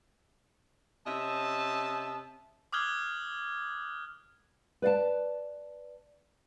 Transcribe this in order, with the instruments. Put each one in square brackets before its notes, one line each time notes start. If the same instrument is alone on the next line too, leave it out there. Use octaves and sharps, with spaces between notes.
[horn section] C3 C#4 D#5 E5 A5
[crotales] D6 D#6 F6 F#6 G#6 G7
[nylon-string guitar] B4 D5 F5 A5